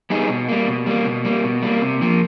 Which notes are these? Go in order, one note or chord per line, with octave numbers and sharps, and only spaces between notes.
G3 B3 D#4 G#4
B2
G3 A#3
B2
G3 A#3
B2
G3 A#3
B2
G3 A#3
C3
F3 A#3